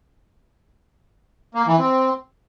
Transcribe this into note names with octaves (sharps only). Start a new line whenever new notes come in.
A#3
E3
C4